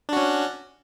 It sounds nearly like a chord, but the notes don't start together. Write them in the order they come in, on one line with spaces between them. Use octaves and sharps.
D4 F#4 C#4